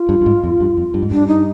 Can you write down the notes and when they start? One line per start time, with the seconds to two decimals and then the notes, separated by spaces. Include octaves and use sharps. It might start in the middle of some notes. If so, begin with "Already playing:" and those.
Already playing: F4
0.09 G2
0.21 G2
0.26 G#2
0.44 F2
0.60 G2
0.77 F2
0.94 G2
1.02 G#2
1.11 G2 D4
1.28 D#4